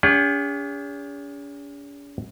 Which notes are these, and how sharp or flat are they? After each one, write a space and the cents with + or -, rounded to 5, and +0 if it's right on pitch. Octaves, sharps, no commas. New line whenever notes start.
C#4 +45 G#4 -40 F#5 +0